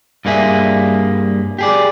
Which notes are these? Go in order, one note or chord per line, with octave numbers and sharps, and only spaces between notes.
G2 G3 A#3 G#4 E5
G4 G#4 D5